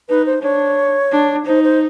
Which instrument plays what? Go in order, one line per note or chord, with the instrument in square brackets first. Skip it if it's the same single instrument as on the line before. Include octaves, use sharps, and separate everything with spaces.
[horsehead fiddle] D#4 [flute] B4
[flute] C5
[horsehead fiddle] D4 [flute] C#5
[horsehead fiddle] D4
[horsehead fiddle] D#4 [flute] C5
[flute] C5